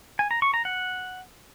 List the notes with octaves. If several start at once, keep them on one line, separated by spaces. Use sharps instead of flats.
G#5
A#5
C#6
A#5
F#5